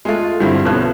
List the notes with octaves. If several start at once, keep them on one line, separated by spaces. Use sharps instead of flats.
G#3 A3 F4
G2 D3 G3 C4 E4
B1 F3 B3 C#4 F#6